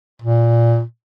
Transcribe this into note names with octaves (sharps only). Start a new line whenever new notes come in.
A#2